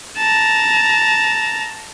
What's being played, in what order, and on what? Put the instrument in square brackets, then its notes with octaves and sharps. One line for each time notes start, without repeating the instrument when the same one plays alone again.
[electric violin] A5 A#5